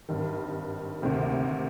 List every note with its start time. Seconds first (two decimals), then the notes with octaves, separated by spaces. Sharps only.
0.09 G#1 G2 D#3
1.00 D2 C3 D#3 A#3